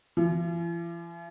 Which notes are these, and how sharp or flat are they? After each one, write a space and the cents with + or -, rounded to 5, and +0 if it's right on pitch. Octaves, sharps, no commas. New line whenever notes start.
E3 +45